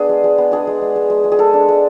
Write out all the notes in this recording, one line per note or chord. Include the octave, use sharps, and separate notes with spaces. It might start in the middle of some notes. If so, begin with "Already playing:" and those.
Already playing: B3 D4 G#4
G#3
G#3
B3
D4 G#4
G#3
G#3
G#3
G#3
G#3
G#4
G#3 A4
D4
G#3